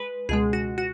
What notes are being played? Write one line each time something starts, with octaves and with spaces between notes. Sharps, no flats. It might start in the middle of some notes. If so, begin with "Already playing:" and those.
Already playing: G#3 B4
C#2 B2 G#3 G#4
F#4
F#4